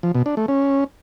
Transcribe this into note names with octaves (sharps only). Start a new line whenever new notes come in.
F3
B2
D4
A3
C#4